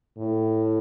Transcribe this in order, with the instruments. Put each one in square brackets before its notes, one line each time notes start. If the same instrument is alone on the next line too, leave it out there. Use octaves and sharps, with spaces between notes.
[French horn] A2